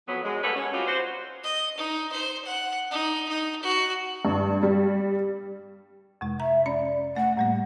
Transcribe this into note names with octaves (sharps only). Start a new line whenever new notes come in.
F2 F#3 B3
F#2 G#3
G3 A#3 A4 B4 C#5 F#5
C#4
G3 C4 D#4 F4 F#4
F#4 C5
D#5
D#4
C5
F#5
D#4
D#4
F#4
G2
G3
F2 C3 G#3
E5 A#5
C#4 D5 A#5
A3 F#5
A2 G3 A#3 F#5